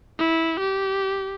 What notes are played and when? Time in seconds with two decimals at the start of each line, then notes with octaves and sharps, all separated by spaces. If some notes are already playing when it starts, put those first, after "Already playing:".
0.19 E4
0.60 G4